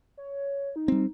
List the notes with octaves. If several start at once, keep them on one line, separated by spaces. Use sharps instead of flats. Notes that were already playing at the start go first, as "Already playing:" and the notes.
C#5
D#4
G3 C4